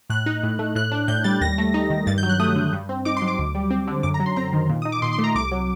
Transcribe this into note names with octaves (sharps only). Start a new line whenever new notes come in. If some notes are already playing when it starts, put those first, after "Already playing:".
A2 F#6
D#4
A2
A3
A2 F#6
D4
A2 G6
G3 A6
D#2 A#6
A3
D#4
D#3
G2 A6
G6
F#3
F#6
A3 D#6
D3
G2
C4
D#4 D6
C6
F#3
D6
D2
G3
C4
D3
F#2 D6
A#5
F#3
C6
C4 A#5
D#3
A#2
D#4 D#6
D6
A#2 C6
C6
A3
A#5
C2 D6
F#3